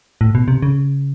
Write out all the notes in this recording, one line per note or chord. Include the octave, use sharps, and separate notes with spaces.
A2
B2
C3
C#3